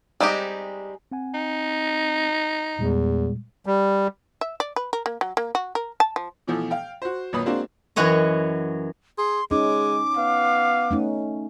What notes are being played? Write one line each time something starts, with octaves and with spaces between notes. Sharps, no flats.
G3 G#3 C4 D#4 G4
C4 F#5 G#5
D#4
E2 A#2 G3 G#3
G3
E5
D5
B4
A#4
A#3
F#3
A#3
F#4
A#4
A5
F3
B2 E3 F3 A3
F5 G5
F#4 C5
G#1 A#2 F#3 B4 B5 D#6
G#3 A#3 C4 D4 F#4 C5
F#2 E3 F#4 C#5 D#5
G#4 C6
G#3 C#4 D#4 D6
B3 F5
A3 C#4 D#4